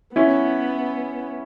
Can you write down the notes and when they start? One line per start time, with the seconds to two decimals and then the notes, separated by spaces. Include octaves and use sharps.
0.16 B3 C#4 E4